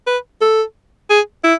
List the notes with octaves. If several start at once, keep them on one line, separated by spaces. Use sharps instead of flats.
B4
A4
G#4
E4